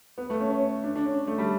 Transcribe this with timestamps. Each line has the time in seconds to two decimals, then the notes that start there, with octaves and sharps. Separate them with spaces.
0.18 B3
0.30 A3
0.40 C#4
0.50 C#4
0.84 D4
0.96 D4
1.06 C#4
1.27 A3
1.38 G3